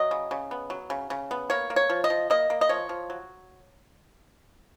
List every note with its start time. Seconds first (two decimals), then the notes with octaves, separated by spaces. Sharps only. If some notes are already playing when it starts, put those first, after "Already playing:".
Already playing: F#3 D#5
0.11 C#3
0.31 C#3
0.51 B3
0.70 F#3
0.90 C#3
1.10 C#3
1.31 B3
1.50 A#3 C#5
1.70 A#3
1.76 C#5
1.90 F3
2.04 D#5
2.10 F3
2.30 A#3 D#5
2.50 A#3
2.61 D#5
2.69 F3 C#5
2.89 F3
3.10 F#3